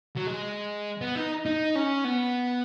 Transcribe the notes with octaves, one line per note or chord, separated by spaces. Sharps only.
F#3
G#3
B3
D#4
D#4
C#4
B3